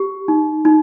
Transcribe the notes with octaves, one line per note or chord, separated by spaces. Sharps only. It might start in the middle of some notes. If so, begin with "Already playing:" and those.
Already playing: G4
D#4
D#4